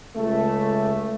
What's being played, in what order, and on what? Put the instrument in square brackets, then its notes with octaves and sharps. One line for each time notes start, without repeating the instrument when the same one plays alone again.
[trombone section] C#2 C#3 A3